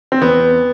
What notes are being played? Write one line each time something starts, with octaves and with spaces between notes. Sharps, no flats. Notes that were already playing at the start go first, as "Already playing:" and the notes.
C4
E2 B3